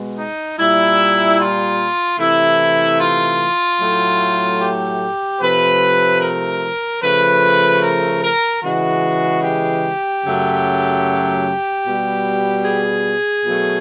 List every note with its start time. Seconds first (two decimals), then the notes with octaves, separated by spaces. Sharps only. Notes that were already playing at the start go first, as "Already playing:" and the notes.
Already playing: B2 G#3
0.18 D#4
0.58 A#2 G3 E4
1.39 F4
2.19 C3 E3 A3 E4
3.00 F4
3.80 A2 F#3 A3
4.61 G4
5.42 C3 F3 A3 B4
6.21 A#4
7.02 C#3 F3 A3 B4
7.83 A#4
8.23 A#4
8.63 C#3 E3 G#3 F#4
9.44 G4
10.24 F#2 C#3 F#3 A3
11.84 B2 G3
12.65 G#4
13.45 B2 F#3 A3